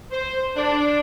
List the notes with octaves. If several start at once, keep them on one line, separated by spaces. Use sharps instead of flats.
C5
D4